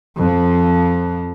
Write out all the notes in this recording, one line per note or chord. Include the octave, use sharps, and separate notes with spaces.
F2 F3